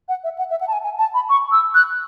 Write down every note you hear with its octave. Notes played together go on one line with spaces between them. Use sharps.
F#5
E5
F#5
E5
F#5
A5
G#5
G#5
A5
B5
C#6
E6
F#6